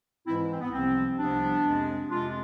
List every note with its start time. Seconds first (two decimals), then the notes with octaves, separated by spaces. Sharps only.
0.26 G#2 E3 G#3 C4 E4
0.49 C4
0.61 B3
0.71 C2 C3 F3 C4
1.18 C2 C3 F3 B3 D4
1.63 F2 C3 G#3
2.09 F2 C3 G#3 D4 F4